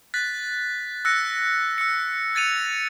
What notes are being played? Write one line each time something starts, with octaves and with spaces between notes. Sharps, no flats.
F#6 A6 B6
E6 F#6 A#6 C#7
E6 C#7
G#6 A6 C#7 D#7 F7